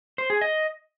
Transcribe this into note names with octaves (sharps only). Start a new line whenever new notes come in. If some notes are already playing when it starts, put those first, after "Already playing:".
C5
G#4
D#5